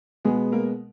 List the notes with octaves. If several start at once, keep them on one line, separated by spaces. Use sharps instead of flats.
B2 G#3 B3 G#4
A#3 A#4